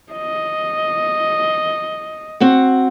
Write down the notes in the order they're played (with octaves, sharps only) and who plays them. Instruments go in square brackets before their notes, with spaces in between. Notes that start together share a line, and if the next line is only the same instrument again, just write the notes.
[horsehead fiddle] D#5
[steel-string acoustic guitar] C4 F#4 F#5